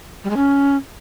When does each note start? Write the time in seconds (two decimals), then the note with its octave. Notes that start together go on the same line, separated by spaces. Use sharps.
0.24 G3
0.30 G#3
0.36 C#4